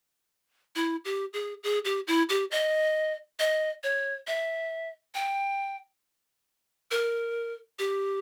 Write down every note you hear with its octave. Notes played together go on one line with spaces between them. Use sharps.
E4
G4
G#4
G#4
G4
E4
G4
D#5
D#5
C#5
E5
G5
A#4
G4